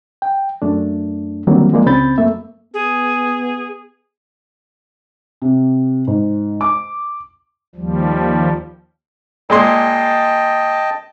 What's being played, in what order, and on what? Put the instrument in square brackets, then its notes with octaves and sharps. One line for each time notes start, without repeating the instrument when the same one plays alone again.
[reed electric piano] G5
F#2 A3 D4
D3 D#3 F#3 G3 A#3 C4
F3 G#3 A#3 D5
C#2 C#3 C4 B5 G6 A6
F#2 A3 A#3 E5
[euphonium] B3 [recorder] G#4
[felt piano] C3
G#2
D6
[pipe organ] D#2 F3 G3
[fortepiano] A#2 G#3 C6 [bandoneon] D#5 G5 A5